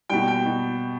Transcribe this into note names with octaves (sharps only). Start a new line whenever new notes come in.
B2 G3 G5
G5
B2